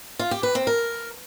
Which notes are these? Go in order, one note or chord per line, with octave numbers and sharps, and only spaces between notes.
F4
G4
B4
C4
A#4